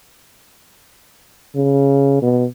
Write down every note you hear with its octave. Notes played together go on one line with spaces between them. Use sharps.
C#3
B2